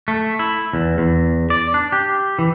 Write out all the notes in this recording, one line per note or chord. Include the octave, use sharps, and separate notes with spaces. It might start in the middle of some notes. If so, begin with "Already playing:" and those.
A3
E4
E2
E2
D5
D4
G4
E3